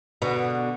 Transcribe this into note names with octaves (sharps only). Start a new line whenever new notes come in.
B2 D3